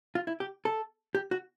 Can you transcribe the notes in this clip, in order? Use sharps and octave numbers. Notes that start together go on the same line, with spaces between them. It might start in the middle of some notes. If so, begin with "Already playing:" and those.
F4
E4
G4
A4
G4
F#4